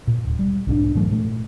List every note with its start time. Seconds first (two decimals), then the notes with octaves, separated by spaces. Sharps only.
0.07 A#2
0.25 D1
0.39 G3
0.67 B1 G#2 C4 D4
0.95 G#2 E3 F#3 A3
1.11 A#2 A3